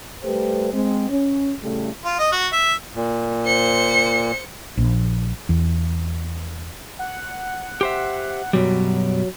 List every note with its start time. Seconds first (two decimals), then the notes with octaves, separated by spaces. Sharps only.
0.24 G3 A3 G4 B4 C5
0.73 G#3 C4
1.10 C#4
1.62 A2 C#3 G3 A3
2.05 F4
2.19 D#5
2.32 F#4
2.52 E5
2.95 A#2
3.46 C5 C#7
4.77 A#1
5.49 E2
6.99 F#5
7.81 G4 C5 E5
8.53 F#2 B2 F#3 G3